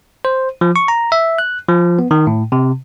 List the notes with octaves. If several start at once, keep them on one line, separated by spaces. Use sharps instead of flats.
C5
F3
C#6
A#5
E5
F#6
F3
B3
D#3
A2
C3